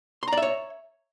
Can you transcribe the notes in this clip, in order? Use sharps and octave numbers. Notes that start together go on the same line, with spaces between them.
C#5 D5 E5 A#5 C6